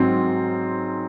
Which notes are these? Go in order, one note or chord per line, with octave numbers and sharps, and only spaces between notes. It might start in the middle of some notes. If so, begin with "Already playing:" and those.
Already playing: G#2 F#3 C4